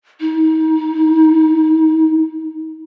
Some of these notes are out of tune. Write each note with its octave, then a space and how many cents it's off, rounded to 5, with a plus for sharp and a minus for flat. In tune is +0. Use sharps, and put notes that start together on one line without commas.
D#4 +30